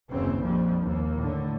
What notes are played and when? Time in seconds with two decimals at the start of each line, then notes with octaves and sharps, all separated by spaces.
0.11 F#1 D#2 C#3 E3 C4
0.41 A#1 F2 A#2 F3 G3 C4
0.84 D#2 A#3
1.18 A2 D3